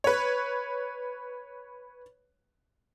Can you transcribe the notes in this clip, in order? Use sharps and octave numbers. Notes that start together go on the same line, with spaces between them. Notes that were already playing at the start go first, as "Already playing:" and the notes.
B4 C#5